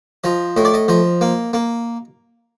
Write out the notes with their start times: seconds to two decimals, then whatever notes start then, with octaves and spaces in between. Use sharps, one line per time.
0.24 F3 D#5
0.57 A2 D#5
0.65 D5
0.74 D#5
0.88 F3 D#5
1.21 A#3
1.53 A#3